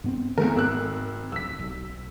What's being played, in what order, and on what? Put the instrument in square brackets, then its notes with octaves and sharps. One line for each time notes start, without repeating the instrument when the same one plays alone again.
[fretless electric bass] G2 B3 C4
[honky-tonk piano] E2 A3 A#4 [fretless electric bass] D#3 G#3 C4
[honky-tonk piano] G#1 E6 F#6
[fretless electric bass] D1 [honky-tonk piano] E6 B6
[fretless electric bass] B1